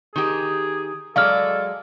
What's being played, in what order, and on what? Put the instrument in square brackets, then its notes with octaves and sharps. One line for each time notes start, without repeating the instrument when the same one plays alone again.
[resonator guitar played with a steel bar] D#3 G4 [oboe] G#4
[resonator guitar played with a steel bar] F#3 G#3 D5 [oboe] A4 [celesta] F5 F6